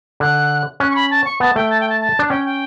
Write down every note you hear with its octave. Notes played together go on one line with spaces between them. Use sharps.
D3 F#6
C#4 F#6
C#6
B5
A5
C#6
B3 A5
A3 G5
A5
G5
A5
A5
D4
C#4 G5
G5